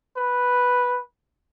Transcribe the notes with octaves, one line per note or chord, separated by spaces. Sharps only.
B4